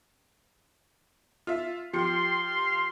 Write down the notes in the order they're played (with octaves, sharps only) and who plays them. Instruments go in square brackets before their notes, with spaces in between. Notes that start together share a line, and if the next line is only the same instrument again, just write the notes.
[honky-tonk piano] F4 E5
[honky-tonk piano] F3 G4 C#7 [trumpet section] F5 C6